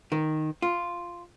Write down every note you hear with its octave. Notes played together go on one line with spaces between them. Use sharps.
D#3
F4